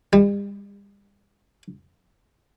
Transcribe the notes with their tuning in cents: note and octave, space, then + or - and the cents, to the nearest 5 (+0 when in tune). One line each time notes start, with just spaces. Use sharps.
G3 +40